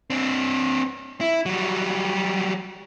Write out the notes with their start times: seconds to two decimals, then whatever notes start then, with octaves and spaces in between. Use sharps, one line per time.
0.10 C4 D4
1.21 E4
1.46 F#3 G3